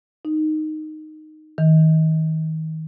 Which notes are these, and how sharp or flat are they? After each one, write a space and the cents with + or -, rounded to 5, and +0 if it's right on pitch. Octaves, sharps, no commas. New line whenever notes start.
D#4 -5
D#3 +30